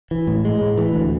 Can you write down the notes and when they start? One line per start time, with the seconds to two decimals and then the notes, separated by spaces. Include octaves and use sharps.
0.11 E3
0.27 A2
0.45 G#3
0.61 A2
0.78 E3
0.94 D2